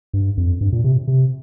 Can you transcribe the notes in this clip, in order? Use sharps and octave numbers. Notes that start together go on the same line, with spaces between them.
G2
F2
G2
A#2
C3
C3